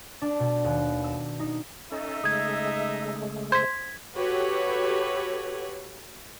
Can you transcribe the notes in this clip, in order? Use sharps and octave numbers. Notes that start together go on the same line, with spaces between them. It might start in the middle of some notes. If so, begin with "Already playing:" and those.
D4
B2
D#2
E6
D#4
C#4 D#4 A4 D#5 E5
C#3 G#3 A3 D#6 G#6
C5 G#6 B6
F#4 G4 A4 B4 C#5